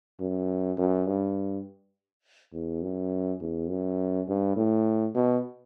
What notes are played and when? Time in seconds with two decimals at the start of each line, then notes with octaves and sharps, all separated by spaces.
0.20 F#2
0.78 F#2
1.07 G2
2.53 E2
2.82 F#2
3.41 E2
3.70 F#2
4.28 G2
4.56 A2
5.15 B2